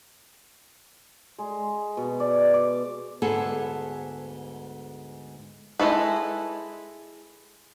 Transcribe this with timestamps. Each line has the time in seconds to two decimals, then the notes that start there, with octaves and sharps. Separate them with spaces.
1.38 G#3
1.97 B2
2.20 D5
2.53 D6
3.22 D2 G#2 B3 G#4 A4 A5
5.79 G#3 D4 E4 A4 B4